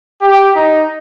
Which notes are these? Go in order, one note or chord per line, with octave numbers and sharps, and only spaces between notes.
G4
D#4